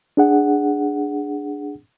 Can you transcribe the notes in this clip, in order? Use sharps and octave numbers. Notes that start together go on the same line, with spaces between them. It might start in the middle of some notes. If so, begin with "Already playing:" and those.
D4 G#4 F#5